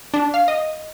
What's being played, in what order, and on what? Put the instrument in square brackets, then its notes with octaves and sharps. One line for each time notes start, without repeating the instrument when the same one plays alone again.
[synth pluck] D4
F5
D#5